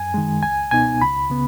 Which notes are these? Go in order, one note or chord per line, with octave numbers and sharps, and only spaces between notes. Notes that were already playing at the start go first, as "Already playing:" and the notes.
Already playing: F#2 G#5
D#3 G#3
C#2 G#5
B2 B3 D#4 G#5
C#2 B5
C#3 B3